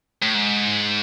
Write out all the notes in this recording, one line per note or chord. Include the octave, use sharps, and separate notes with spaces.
A2
G#2